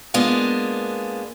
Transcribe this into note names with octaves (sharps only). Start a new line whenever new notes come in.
G#3 A#3 B3 D4 F4